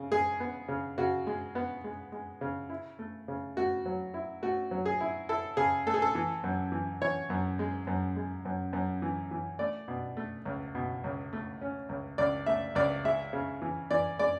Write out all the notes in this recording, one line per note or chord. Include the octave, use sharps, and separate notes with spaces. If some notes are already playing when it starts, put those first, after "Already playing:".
Already playing: C#3
G#3 G#4
B3
C#3
C#3 F#4
G#3
B3
G#3
G#3
C#3
E4
A3
C#3
A3 F#4
F#3
E4
A3 F#4
F#3
G#4
E4
E4 A4
C#3 G#4
A3 A4
G#4
A4
E3
F#2
E3
E3 C#5
F#2
G#3
F#2
G#3
F#2
F#2
E3
E3
A3 D5
B2
A3
C#2
B2
C#2
A3
C#4
C#2
C#2 D5
A3 E5
C#2 D5
G#3 E5
C#3
E3
E3 D5
G#3 D5